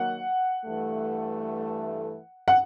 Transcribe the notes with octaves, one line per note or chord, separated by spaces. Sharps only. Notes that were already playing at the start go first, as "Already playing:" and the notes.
Already playing: D#3 F#3 A#3 F#5
G2 E3 A3
F#5